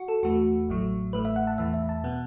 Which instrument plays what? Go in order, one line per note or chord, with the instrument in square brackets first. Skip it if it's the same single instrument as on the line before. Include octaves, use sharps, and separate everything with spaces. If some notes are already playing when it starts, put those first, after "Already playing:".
Already playing: [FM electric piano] F#4
A4
E2 E3 A3 F#4
A1 A2 F#3 A3
A1 A2 A3 B4
E5
F#5
A5
E2 E3 A3 E5
E5
A5
B2 B3